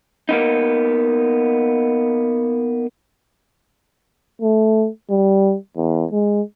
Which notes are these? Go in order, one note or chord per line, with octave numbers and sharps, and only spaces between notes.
A#3 B3 D#4
A3
G3
E2
G#3